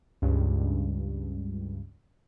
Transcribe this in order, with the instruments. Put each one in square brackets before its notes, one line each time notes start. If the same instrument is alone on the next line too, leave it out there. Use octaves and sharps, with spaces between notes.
[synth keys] C#2 G2